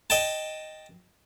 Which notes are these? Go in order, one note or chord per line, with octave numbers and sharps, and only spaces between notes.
D#5 G5 A5